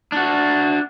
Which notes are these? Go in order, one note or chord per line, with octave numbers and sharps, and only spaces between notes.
D4 F#4